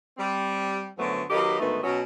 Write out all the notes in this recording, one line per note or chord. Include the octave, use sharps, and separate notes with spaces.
G3 C4
F#2 D3 F3 F#3 A3 B3
D#3 F#3 A#3 G4 B4 D#5
D2 G#2 D#3 A3 B3 B4
B2 F#3 C#4